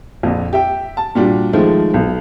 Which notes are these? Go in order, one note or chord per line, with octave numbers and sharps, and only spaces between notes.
A#1 F2
G4 E5 G5
A5
A#2 G3 D4 F#4
D#3 F3 G#3 A3
B1